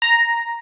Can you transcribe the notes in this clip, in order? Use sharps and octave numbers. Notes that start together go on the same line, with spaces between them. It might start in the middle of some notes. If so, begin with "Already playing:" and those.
A#5